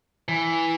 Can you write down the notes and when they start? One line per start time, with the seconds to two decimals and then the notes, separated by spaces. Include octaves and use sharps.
0.29 E3